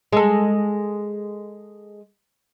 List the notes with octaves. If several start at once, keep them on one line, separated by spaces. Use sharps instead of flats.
G#3 A4